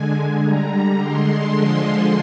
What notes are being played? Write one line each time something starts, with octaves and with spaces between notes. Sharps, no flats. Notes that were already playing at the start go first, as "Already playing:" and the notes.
Already playing: D3 G#3 G#5
D3 G3 A#5
A#5
D3 G#3 C6
D3 F3 G#3